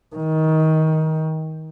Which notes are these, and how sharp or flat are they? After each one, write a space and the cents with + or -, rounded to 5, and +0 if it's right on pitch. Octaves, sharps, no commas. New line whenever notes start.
D#3 +20